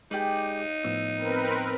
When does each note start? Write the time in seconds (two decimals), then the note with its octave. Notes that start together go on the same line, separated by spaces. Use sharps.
0.11 G#3 D#4 G4 G#4 B4 D5 G5
0.84 A2 F3 B3 E6
1.16 C4 A#4 B4